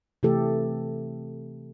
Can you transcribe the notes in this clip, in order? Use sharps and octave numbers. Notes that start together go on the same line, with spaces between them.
C3 E3 A3 G4 A4